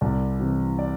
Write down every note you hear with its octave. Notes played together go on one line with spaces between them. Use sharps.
C2 D5
C3 E3
D5